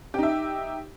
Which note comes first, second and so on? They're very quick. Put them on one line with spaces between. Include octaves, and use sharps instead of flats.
G4 D#4 E5